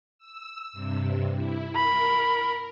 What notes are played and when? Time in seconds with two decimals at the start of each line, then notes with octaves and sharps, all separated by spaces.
0.18 E6
0.73 G2 C3
1.34 E4
1.75 A#4 B5